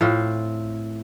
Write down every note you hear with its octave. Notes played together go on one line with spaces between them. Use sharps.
A2 C4 F4